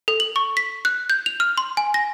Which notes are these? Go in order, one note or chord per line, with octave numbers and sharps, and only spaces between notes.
A4
F#7
C#6
B6
F#6
G6
F7
F6
C6
G#5
A#6